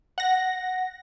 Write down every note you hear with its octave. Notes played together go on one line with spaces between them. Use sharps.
F#5 A#6